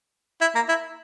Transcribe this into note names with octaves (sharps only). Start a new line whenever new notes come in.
E4
A#3
E4